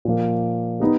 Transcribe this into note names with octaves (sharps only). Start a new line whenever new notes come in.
A#2 F3 A#3
B3 D#4 G4